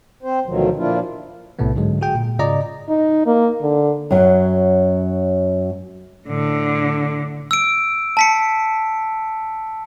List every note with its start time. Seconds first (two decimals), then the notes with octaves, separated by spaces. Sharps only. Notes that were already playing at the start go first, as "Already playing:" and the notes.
0.23 C4 C5
0.45 D2 B2 D#3 F3 F#3
0.77 A#2 F3 A#3 D4 E4 F4
1.59 B1 A2 C3 A3 B3
1.75 G#2 D3 F#3 G#3
2.01 F#4 G#4 G5
2.15 A#2
2.39 G#2 C#3 F4 D5 D#5 A#5
2.89 D#4
3.26 A#3
3.62 D3
4.11 F#2 F#3
6.28 A2 D3
7.51 E6 D7
8.17 A5 B6 C#7